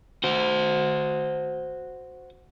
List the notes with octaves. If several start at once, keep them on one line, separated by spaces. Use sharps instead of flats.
F#4 C5